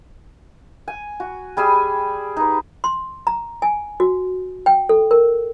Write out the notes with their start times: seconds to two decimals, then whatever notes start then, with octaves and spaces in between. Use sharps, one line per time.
0.88 G#5
1.20 F#4
1.57 G3 G#4 G#5 E6
2.37 D#4 B4
2.84 C6
3.27 A#5
3.62 G#5
4.00 F#4
4.66 G5
4.89 A4
5.11 A#4